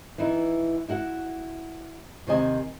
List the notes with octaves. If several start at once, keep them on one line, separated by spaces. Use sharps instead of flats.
E3 B3 D#4 E4
E4 F#4 F#5
D#2 C3 D#3 C5 D#5 G#5